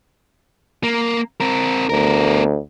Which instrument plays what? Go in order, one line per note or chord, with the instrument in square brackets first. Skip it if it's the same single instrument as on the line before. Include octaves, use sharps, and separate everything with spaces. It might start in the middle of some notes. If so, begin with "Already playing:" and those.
[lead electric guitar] A#3
C4 A#4
[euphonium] D2 [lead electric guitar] B3 A#4